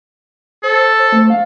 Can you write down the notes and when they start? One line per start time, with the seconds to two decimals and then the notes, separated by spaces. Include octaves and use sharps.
0.63 A4 C5
1.00 C5
1.12 A3
1.30 F5